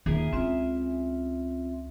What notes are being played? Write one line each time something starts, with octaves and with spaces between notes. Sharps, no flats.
D#2 E4 F4 G#4 A#4
C#2 C4 C#4 F4 E5